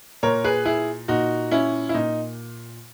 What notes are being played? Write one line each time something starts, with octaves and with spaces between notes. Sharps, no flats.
A#2 A#4 C#5
G#4 B4
E4 G#4
A#2 D#4 F#4
C#4 E4
E4
A#2 D#4